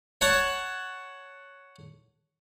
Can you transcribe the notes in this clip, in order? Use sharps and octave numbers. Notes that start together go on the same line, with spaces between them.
C#5 F#5 A5